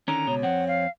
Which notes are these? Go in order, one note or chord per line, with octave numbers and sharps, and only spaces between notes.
D3 D#3 C#4 A#5
C#2 B2 C#5
F2 C4 F#5
F5